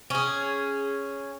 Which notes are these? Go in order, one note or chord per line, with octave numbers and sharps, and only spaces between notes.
C#4 G#4